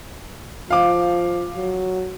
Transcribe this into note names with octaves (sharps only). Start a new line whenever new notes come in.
F3 F5 D6
F#3